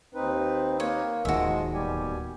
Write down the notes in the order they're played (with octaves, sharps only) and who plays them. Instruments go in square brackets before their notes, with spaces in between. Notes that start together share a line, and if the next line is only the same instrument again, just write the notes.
[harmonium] D#2 D#4 B4 [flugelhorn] C4
[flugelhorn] A#3 [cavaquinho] C#5
[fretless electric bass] D1 D#2 D#3 [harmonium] F3 [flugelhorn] G#3 [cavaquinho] F#4 E5
[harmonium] B2 G4 G#5 [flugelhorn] G3